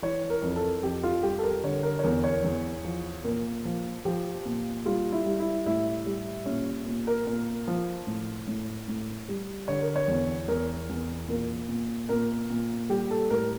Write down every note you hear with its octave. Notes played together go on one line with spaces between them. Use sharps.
E3 C#5
A#4
F2
A4
F2 G4
F4
G3 G4
A4
A#4
D3 C#5
A#4
C#5
E2 A#4
C#5
E2
F3
A#2 A#4
F3
F3 G4
A#2
G3 F4
E4
G3
E4
A2 E4
G3
A#2 C#4
A#2
A#4
A#2 A#4
F3
A2
A2
A2
G3
D3 C#5
A#4
C#5
E2
E2 A#4
E2
A#2 A#4
A#2
A#2 A#4
A#2
G3 G4
A4
A2 A#4